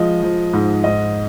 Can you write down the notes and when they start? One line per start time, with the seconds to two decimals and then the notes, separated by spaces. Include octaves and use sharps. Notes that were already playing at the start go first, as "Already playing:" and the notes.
Already playing: F3 G#3 D#5
0.23 F3
0.53 G#2
0.84 G#2 D#5